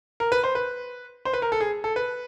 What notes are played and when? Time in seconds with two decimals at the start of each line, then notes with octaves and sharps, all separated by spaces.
0.20 A#4
0.32 B4
0.44 C5
0.55 B4
1.25 C5
1.33 B4
1.42 A#4
1.52 A4
1.60 G#4
1.84 A4
1.96 B4